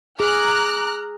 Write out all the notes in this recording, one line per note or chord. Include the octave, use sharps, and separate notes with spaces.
G#4 A#5 D6 F6 F#6